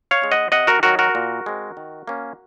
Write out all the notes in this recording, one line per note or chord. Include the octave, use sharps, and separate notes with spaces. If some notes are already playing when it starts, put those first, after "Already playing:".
C#5 F5
G#3 C#4
D#5 F#5
C3 D#5 F#5
F#4 A#4
D#3 F#3 F#4 A#4
F#4 A#4
A#2
G#3 C4
D#3
A#3 C#4